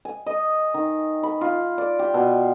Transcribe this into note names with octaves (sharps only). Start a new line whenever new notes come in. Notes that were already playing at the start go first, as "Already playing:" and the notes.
G#5
D#5
D#3
B5
F4
D5
G4
B2